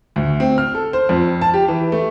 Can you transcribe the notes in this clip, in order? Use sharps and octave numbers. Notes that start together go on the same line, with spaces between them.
D2
C4
F6
A4
C5
F2
A5
G4
E3
A3